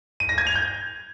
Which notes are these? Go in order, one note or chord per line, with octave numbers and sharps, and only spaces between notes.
D#7
A#6
G#6
F7
G6